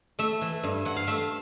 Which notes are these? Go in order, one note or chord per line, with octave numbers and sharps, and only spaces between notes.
A3 E5
E3
G2
G2 F#5
F5
A3 E5
F5